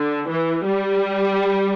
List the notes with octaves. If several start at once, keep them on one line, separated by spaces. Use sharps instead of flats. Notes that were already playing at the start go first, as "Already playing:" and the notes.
Already playing: D3
E3
G3